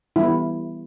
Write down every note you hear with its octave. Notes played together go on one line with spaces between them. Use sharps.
E3 G3 B3 E4